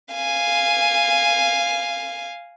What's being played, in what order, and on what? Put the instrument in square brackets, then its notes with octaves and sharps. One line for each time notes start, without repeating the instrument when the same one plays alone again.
[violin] F5 G#5